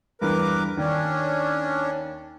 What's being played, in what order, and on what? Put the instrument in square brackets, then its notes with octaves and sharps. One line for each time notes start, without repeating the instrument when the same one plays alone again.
[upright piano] E2 G2 [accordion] A#4 B4 D6
[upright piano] D#2 [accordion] C#4 D4